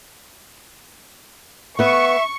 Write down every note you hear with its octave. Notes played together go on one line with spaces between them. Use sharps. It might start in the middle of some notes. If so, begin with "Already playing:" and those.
B3 B4 E5 C#6